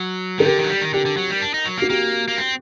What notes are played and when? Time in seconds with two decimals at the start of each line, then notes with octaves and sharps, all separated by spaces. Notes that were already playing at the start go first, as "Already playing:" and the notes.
Already playing: F#3
0.39 D#3 A4
0.45 D3 G4 A#4
0.58 D#3
0.64 F#3
0.69 G3
0.82 D#3
0.94 D3 G4
1.06 D3
1.17 F#3
1.30 G3
1.42 D4
1.54 D#4
1.66 F#3
1.78 A#3
1.82 F#4
1.90 A#3 G4
2.28 A#3
2.38 C4